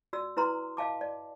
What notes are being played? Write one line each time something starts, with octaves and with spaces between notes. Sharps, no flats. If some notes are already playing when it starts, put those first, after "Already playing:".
F#4 D5 E6
E4 B4 A#5 C6
D#5 F5 A5 D6
D5